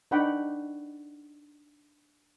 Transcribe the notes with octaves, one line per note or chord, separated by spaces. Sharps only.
D4 D#4 D5 F#5 G5 B5